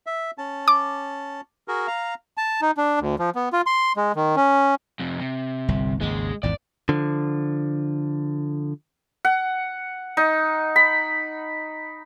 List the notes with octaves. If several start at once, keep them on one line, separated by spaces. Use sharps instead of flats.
E5
C#4 A5
D6
F#4 G#4 A#4
F5 A#5
A5
D#4
D4
D2
F3
B3
F4
C6
G#3
D#3
C#4
F2 C3
C3
G1 C2
G#1 D#2 C#3 G#3
G#1 E2 G#2 D5
D3 F3
F#5
D#4
B5